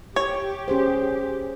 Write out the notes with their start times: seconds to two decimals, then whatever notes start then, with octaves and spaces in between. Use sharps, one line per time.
0.16 G4 C#5
0.68 C#4 G#4 C5